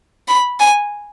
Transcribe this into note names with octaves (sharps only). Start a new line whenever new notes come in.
B5
G#5